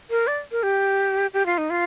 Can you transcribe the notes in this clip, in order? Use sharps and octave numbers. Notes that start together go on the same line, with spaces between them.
A#4
D5
A#4
G4
G4
F4
D#4
F4